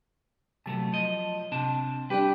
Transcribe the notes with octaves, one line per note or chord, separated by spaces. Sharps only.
C3 F#3 A3 B3 A5
F3 D#5
C3 C4 D4 A5
G3 D4 G4 B4